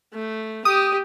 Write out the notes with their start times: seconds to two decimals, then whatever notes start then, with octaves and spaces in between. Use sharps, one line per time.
0.13 A3
0.65 G4 D#6